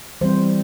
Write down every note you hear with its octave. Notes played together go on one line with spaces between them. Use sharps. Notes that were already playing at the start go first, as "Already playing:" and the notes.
E3 G3 C4 C5